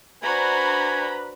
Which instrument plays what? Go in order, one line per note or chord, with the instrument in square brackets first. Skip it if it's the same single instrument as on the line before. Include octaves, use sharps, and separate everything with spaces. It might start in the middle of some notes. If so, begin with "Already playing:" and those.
[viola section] D4 A#5 B5 [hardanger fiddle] F#4 C5 [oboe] B4 [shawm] G#5